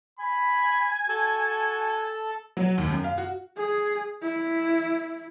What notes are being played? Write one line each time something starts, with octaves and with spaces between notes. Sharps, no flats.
G#5 B5
F#4 A4 A5
F#3
D#2
F#2
F5
F#4
G#4
E4